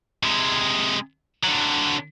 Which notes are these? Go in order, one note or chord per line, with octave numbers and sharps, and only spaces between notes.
C3 G#3
D3 F#3